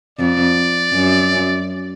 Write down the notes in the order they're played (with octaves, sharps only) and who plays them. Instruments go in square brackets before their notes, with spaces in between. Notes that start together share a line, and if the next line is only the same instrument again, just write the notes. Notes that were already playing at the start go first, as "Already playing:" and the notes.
[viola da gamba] F2 [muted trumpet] D5
[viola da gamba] F#2